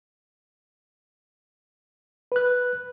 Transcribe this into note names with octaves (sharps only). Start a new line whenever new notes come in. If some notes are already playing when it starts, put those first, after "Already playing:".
B4 F#6